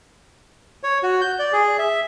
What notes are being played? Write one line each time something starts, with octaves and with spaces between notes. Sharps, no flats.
C#5
F#4
G6
D5
G#4
E5